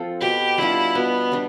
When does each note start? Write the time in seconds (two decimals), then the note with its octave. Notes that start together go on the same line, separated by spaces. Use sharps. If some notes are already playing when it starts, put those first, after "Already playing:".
Already playing: F3 C4 F4 A4
0.21 B2 G4
0.58 G3 D4 E4 F4
0.95 B2 B3
1.32 G3 D4